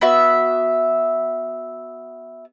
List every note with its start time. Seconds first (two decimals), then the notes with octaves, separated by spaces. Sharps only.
0.01 B3 F#4 E5